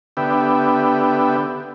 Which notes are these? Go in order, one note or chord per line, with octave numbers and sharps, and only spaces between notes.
D3 B3 G4 E5